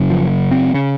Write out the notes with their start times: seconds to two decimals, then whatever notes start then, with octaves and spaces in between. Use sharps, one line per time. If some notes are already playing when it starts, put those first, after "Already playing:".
Already playing: F#1 F#2 C#3
0.10 F3
0.51 C4
0.74 C#3